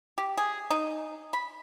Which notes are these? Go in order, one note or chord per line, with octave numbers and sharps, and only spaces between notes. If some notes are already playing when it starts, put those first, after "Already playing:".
G4
G#4
D#4
B5